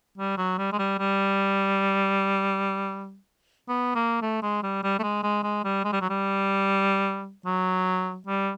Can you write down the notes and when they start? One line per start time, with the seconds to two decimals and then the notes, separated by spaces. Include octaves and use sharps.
0.18 G3
0.38 F#3
0.58 G3
0.73 G#3
0.79 G3
0.99 G3
3.69 B3
3.95 A#3
4.22 A3
4.43 G#3
4.63 G3
4.84 G3
4.99 A3
5.03 G#3
5.23 G#3
5.44 G#3
5.64 G3
5.85 G#3
5.93 G3
6.01 F#3
6.10 G3
7.46 F#3
8.27 G3